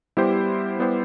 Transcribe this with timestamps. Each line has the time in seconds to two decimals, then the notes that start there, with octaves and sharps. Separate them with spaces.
0.17 G3 B3 E4 G4 C5
0.79 G3 B3 E4 G4 C5